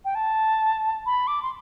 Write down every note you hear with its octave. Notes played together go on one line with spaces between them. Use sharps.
G5
A5
B5
D6
C6